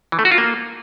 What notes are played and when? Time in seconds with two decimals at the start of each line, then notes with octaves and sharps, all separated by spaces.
0.12 E3
0.19 A3
0.25 F#4
0.32 F4
0.38 A#3